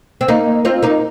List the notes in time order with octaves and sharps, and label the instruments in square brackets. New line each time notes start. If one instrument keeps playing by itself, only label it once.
[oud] C4
A#3 D#4
C4 F4
A#3 D#4